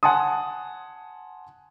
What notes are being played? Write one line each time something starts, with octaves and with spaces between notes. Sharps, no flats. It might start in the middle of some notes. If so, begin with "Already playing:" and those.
F#5 G#5 A5 C6 D#6